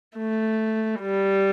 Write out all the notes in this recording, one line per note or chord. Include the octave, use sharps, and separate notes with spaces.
A3
G3